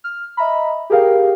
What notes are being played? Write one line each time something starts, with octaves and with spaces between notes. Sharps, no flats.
F6
D#5 E5 A#5 B5
G4 G#4 A#4 F5 G5